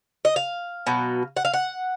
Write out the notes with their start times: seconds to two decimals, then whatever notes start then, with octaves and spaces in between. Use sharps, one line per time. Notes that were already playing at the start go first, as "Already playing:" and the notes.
0.25 D#5
0.36 F5
0.87 B2 F#3
1.37 F#5
1.45 F5
1.53 F#5